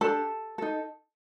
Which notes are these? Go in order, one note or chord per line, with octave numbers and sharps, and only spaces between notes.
D4 G4 A4 A5
D#4 A4